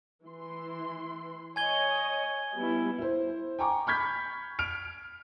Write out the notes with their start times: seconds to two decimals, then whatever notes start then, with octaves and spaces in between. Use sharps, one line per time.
0.24 E3 C6
1.56 C#5 D#5 G#5 G#6 G7
2.55 G3 B3 E4
2.98 E4 C5
3.59 G5 G#5 A#5 C#6 D6
3.87 B5 C#6 F6 G6 G#6 B6
4.59 F6 D7 F7